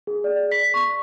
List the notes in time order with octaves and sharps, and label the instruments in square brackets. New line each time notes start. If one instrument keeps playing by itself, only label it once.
[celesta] G#4
D5
B6
C#6